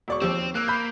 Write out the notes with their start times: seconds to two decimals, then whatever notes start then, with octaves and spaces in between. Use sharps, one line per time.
0.08 E1 D5 C#6
0.22 D#2 F3 C4 G4 E6
0.55 A#3 E6 F#6
0.68 B5 G6